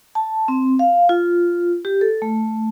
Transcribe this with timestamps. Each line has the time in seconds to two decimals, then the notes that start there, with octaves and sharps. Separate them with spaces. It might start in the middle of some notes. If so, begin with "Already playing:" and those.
0.15 A5
0.48 C4
0.79 F5
1.09 F4
1.85 G4
2.01 A4
2.22 A3